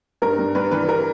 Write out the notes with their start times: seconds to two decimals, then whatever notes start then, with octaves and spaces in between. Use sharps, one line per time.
0.22 G2 A#4
0.38 G2
0.55 G2 B4
0.71 E3 B4
0.89 A#4